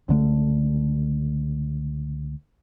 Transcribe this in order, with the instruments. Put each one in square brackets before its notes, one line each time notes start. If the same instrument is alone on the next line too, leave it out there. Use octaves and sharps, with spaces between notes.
[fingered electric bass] C#2 D3 A3